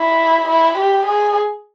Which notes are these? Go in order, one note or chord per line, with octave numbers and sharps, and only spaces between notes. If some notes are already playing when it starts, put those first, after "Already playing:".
Already playing: E4
E4
G4
G#4